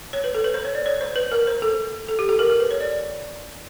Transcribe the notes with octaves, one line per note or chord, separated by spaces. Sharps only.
C#5
B4
A4
B4
C5
C#5
D5
C#5
C5
B4
A#4
C5
A4
A4
G4
A4
A#4
A#4
B4
C#5
D5